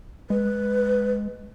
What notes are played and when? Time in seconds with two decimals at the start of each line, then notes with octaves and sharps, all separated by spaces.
0.30 G#3 B4